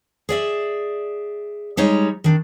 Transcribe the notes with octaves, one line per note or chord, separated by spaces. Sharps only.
G#4 D5 E5
G3 G#3 D#4 C#5
D#3 D4